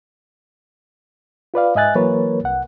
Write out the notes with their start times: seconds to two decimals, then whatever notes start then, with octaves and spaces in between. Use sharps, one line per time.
1.54 F4 B4 D5 F5
1.75 G#2 D#5 E5 G#5 F#6 A6
1.95 E3 F#3 A#3 A#4 B4 C#5
2.44 C2 F#5